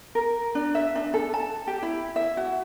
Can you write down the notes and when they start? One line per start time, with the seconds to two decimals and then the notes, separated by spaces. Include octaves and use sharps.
0.15 A#4
0.55 D4
0.75 E5
0.96 D4
1.14 A4
1.34 A5
1.67 G4
1.82 E4
2.16 E5
2.37 F#4